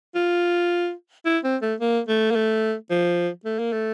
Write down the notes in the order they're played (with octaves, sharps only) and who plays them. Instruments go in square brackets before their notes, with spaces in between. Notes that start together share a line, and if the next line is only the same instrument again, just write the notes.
[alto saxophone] F4
E4
C4
A3
A#3
A3
A#3
A3
F3
A3
A#3
A3